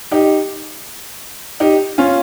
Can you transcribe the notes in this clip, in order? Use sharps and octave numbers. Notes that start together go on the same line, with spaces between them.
D#4 G4
D#4 G4
C#4 F4